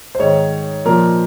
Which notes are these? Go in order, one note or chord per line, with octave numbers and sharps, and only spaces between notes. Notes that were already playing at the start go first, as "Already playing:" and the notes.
C5
G#2 D#3 C#5
A#2 F3 A#4